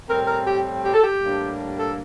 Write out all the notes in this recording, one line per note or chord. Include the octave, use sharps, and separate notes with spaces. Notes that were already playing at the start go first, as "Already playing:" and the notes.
A2 G3 C4 A#4
A#4
G4
G4
A4
G4
A2 G3 A#3 D4
A4